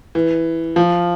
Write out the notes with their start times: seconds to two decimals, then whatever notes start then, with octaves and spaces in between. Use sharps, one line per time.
0.15 E3
0.76 F3